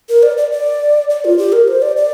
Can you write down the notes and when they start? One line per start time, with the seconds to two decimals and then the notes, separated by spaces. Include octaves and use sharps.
0.09 A#4
0.23 D5
0.38 D5
0.52 D5
1.10 D5
1.25 F4
1.38 G4
1.52 A#4
1.68 C5
1.82 D5
1.97 D5